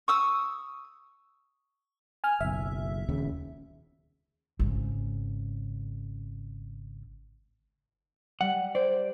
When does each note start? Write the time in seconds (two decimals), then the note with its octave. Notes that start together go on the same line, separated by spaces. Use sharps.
0.08 C#6 D#6 E6
2.24 G#5 F6
2.41 F#1 B1 E5
3.09 D#1 D#2 C#3
4.59 G#1 C#3
8.41 G3 F#5
8.75 C5 D5